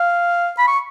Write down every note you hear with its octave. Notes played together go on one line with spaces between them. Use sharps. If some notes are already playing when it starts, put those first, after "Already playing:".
Already playing: F5
B5
C#6